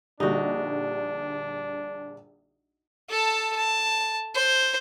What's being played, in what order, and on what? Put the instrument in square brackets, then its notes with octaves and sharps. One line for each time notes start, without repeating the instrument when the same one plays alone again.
[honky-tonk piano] A#1 D3 G3 [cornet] D4 [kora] D#4 F#4
[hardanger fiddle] A4 A5
A5
C5